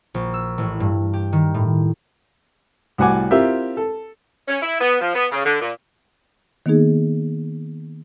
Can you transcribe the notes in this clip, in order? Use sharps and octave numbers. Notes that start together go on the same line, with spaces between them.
A#1
E6
A1
G2
G4
D#3
A2
C2 A2 F#4 F#5 G#5 D6
C4 E4 F4 G4 A#4 E5
A4
C#4
E4
B3
F3
B3
C#3
D3
A#2
D#3 A#3 B3 D#4 G#4